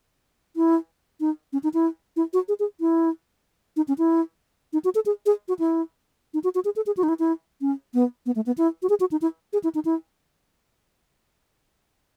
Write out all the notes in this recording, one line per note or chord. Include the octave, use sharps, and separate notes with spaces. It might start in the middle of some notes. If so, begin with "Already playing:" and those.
E4
D#4
C#4
D#4
E4
E4
F#4
G#4
G#4
E4
D#4
C#4
E4
D#4
F#4
A4
G#4
G#4
F#4
E4
D#4
F#4
F#4
G#4
A4
G#4
F#4
D#4
E4
E4
C#4
B3
B3
A3
B3
E4
F#4
G#4
F#4
D#4
E4
G#4
E4
D#4
E4